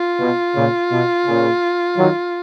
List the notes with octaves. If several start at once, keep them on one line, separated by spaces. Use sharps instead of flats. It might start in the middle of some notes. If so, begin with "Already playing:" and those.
Already playing: F4
B2
A#2 C#3
B2
A#2 C#3
D#3 F#3